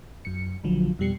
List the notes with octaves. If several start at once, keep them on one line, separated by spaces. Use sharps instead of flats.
F#2 C#7
A#1 D3 F3 F#3
F2 B2 G3 C7 C#7